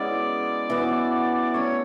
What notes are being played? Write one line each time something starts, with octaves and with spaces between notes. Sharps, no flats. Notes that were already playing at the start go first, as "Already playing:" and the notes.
Already playing: G#3 B3 C#4 E4 F#4 G#4 D5
E3 B3 F#4
F#3 A3 C#4 C#5